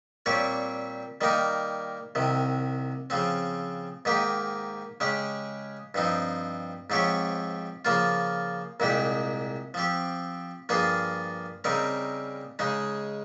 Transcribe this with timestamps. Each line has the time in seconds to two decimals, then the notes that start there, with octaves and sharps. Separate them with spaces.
0.26 A#2 G3 C4 G4 C#5
1.21 D#3 G3 A#3 D#4 A#4
2.15 C2 C3 D#3
3.10 C#3 F3 C4
4.05 G#2 D#3 A#3 D#4 G4
5.00 C#3 G#3 C#4 G4
5.94 G2 F3 C4 D#4
6.90 G#2 F3 C4 G4 C#5
7.85 C#3 F3 A#3 F4
8.80 C2 A#2 G#3 D#4 G4
9.74 F3 C4 G4
10.69 G2 F3 A#3 F4 G#4
11.64 C#3 G3 C4 D#4 A#4
12.59 C#3 G#3 D#4